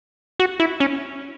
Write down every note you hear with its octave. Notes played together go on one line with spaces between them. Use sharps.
F#4
E4
C#4